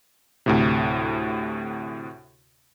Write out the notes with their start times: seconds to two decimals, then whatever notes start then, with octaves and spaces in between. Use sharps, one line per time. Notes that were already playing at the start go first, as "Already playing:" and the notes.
0.46 D2 A2 C3